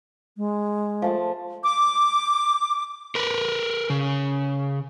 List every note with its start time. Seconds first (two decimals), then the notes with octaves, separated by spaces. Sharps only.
0.37 G#3
1.02 F3 A3 A5
1.63 D6
3.15 A#4 B4
3.90 C#3